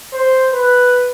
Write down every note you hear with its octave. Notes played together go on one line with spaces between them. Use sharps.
C5
B4